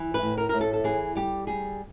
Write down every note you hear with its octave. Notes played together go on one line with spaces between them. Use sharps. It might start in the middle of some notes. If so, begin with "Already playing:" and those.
Already playing: E3
B4
A2
A#4
A2 A#4
A4
A4
E3 G#4
G3 G4
G3 G#4